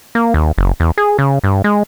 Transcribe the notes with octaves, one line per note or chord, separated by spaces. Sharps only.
A#3
D#2
F#1
E2
G#4
C#3
G2
G#3